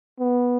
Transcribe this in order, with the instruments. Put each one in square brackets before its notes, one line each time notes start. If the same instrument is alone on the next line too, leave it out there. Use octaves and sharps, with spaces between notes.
[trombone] B3